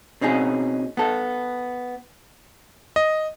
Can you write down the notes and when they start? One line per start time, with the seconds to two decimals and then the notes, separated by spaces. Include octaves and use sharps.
0.21 B2 C4 C#4 D#4 G#4
0.97 B3 A4
2.96 D#5